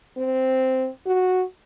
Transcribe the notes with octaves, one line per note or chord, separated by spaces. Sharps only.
C4
F#4